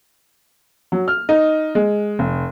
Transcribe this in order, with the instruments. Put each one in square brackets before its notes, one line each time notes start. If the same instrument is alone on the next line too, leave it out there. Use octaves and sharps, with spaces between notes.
[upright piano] F#3
F6
D#4
G#3
F1